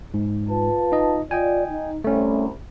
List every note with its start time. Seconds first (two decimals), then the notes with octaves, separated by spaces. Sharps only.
0.14 G#2
0.49 F4 B4 A5
0.92 D#4 D#5
1.31 F4 D5 D#5 G5 G#5
1.68 D#4
2.04 C2 A3 C#4